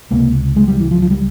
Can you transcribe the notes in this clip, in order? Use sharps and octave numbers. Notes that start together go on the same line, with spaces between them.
C#2 C3 A#3
G#3
G3
E3
F3
F3
G3